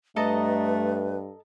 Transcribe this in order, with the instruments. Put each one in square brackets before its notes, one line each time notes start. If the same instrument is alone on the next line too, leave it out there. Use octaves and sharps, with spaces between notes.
[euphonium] G2 [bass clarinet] A3 [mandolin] A4 D#5 A#5 [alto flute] B4